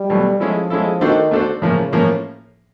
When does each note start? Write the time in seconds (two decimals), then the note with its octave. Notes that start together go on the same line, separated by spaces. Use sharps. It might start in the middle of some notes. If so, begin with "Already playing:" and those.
Already playing: G3
0.10 B2 F#3 A3
0.40 F3 G#3 C#4 E4 A4
0.70 G#3 C#4 E4 A4
1.01 D#3 A3 D4 F#4 A4 C5
1.31 D3 A3 D4 F#4 A4 C5
1.62 A2 C#3 F3 A#3 C#4
1.92 A2 F3 A#3 C#4